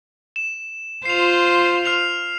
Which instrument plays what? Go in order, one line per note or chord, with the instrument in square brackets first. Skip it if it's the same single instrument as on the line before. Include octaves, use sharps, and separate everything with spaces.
[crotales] E7
[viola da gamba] F4 C5 [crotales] C7 F7
[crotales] F6 C7 F7